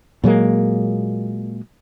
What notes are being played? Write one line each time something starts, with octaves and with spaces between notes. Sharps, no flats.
A#2 F#3 G#3 A#3